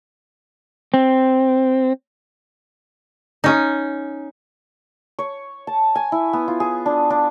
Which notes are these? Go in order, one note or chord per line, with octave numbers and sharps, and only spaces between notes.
C4
C#4 D#4
C#5
A5
G#5
E4
B3
F4
G#4
D4
D4